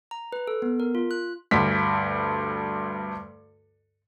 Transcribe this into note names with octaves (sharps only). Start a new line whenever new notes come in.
A#5
B4
A4
B3
A#4
F4
F#6
D2 G2 B6